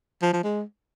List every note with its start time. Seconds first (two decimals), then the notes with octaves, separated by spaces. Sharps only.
0.22 F3
0.33 F3
0.44 G#3